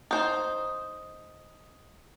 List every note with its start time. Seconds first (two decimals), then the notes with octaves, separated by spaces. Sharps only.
0.11 D#4 C5